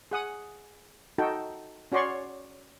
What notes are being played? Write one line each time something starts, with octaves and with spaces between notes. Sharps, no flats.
G#4 F#5 D#6
D#4 F#4 A4 G5
C#4 F#4 C#5 D5 C6 C#6